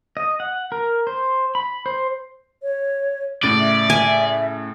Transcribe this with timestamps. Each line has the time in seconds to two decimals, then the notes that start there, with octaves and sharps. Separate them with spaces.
0.17 D#5
0.40 F#5
0.72 A#4
1.07 C5
1.55 B5
1.86 C5
2.63 C#5
3.43 A2 C#3 D5 A6
3.59 E5
3.90 G#5